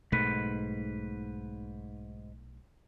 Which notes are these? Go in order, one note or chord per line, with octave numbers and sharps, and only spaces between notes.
B1 G#2 B2 A3 B4